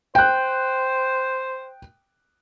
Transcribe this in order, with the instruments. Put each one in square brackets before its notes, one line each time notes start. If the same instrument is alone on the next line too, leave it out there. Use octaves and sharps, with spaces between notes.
[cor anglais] C5 [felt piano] G5 F#6